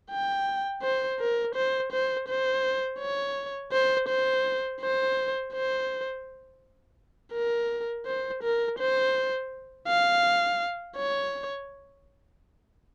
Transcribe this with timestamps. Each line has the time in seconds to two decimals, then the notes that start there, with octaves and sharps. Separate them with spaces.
0.10 G5
0.82 C5
1.20 A#4
1.55 C5
1.92 C5
2.28 C5
2.99 C#5
3.72 C5
4.08 C5
4.81 C5
5.53 C5
7.34 A#4
8.06 C5
8.43 A#4
8.79 C5
9.88 F5
10.97 C#5